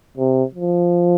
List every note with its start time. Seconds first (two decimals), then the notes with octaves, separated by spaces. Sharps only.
0.18 C3
0.54 F3